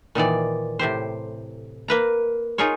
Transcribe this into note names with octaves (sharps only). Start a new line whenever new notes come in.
A#2 D#3 E3 D5
A2 C3 G4 C5
A#3 B4 A#5
D#4 F4 G#4 A#4 C#5